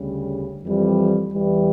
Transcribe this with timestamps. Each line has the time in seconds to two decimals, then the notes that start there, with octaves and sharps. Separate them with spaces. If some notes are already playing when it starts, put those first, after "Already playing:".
Already playing: D2 C#3 G3
0.62 F2 E3 G3
1.32 E2 E3 G3